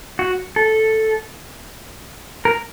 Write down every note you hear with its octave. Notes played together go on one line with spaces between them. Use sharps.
F#4
A4
A#4